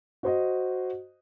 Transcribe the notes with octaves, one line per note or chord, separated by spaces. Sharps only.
F#4 C5 D#5